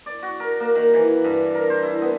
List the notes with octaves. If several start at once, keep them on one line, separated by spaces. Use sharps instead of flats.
D5
F#4
A#4
A#3
D#3
E3
G2
A#4
C5
E4
B3